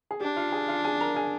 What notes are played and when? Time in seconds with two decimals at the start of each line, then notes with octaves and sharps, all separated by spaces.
0.11 G#4
0.21 D4 G4
0.36 F4 F5
0.52 G#4 G#5
0.68 F4 F5
0.84 G#4 G#5
1.01 A#4 A#5
1.16 G#4 G#5